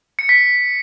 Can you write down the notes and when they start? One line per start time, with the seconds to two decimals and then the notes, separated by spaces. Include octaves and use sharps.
0.19 C#7
0.29 B6